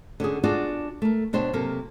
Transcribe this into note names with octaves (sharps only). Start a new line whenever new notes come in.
D3 C#4 F#4 G#4
D4 F4 F#4 G#4 D5
A3 A#4
B2 D4 C5 C#5 G5
C3 F#3 A#3 A4 A#4